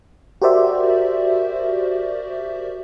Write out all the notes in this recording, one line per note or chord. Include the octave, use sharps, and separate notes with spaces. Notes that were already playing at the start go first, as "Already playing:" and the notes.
F#4 G4 A#4 C5 D5 E5